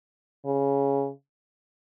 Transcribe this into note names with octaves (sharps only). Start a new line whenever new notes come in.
C#3